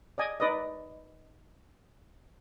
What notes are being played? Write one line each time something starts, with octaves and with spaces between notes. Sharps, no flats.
D5 D#5 G#5
D#4 B4 D5 D#5